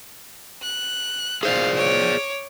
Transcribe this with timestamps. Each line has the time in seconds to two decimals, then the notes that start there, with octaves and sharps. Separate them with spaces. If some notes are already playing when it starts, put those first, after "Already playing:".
0.62 F#6
1.43 G#4 C5 D5 F5
1.77 C#5 D6